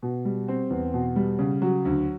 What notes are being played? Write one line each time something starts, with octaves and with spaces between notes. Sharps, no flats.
B2
G3
C4
E2
B2
G3
C#3
F#3
D2